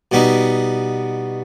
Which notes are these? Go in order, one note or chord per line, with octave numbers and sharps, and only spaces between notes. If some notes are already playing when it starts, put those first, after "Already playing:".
B2 G3 B3 D#4